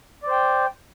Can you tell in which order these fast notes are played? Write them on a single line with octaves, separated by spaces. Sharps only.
D5 C5 G5